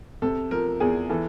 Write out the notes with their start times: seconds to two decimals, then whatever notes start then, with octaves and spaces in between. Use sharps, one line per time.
0.22 C3 A4
0.51 F3 A#4
0.80 E2 G#4
1.10 E3 A4